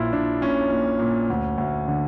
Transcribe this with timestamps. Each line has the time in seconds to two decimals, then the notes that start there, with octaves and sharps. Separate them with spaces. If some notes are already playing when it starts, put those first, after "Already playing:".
Already playing: A#1 A#2 E4 F4
0.13 A#2 D4
0.41 A#2 C#4
0.70 A#2
0.99 A#2
1.30 D2
1.58 D2
1.88 D3